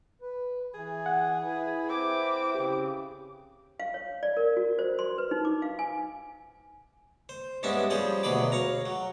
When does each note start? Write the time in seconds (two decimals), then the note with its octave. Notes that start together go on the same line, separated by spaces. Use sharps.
0.22 B4
0.74 E3 G#4
1.06 F#5
1.44 E4 B4
1.89 C4 D6
2.55 C#3 G4
3.80 F5
3.94 C#5
4.23 D5
4.37 A#4
4.57 F#4
4.79 C5
4.99 C6
5.18 B4
5.31 D#4
5.45 D6
5.62 F5
5.79 G#5
7.29 C5
7.63 G2 G#3 B3 C#4 D4 E5
7.90 F3 G3 C#4 G#4 C5
8.23 D2 B2 F#3 G#4 B5 D6
8.52 C#5 F5 A#5
8.86 F#3